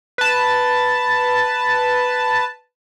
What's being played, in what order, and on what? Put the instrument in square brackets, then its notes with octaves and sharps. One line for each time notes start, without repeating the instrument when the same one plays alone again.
[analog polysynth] B4 A5